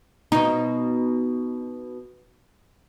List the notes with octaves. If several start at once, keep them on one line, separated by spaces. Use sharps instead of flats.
B2 D#4